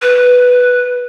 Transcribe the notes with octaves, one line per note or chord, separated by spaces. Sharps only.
B4